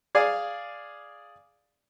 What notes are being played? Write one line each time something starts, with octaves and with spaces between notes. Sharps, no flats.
G#4 D5 F5 G#5